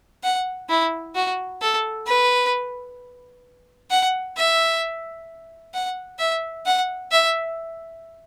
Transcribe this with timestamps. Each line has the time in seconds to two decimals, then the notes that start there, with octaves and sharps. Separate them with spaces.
0.23 F#5
0.69 E4
1.15 F#4
1.62 A4
2.06 B4
3.91 F#5
4.37 E5
5.74 F#5
6.19 E5
6.66 F#5
7.11 E5